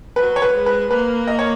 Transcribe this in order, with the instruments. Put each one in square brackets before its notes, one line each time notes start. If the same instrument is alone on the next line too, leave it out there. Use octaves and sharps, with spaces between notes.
[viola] F#3 [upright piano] B4
[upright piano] C#5
B4
[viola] G#3
[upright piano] B4
[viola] A#3 [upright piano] B4
[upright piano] D#5
C#5